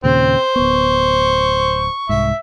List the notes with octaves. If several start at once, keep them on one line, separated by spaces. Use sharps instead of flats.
D#2 A#2 C#3 C4 C5
D1 B3 C#6
C2 G#2 E5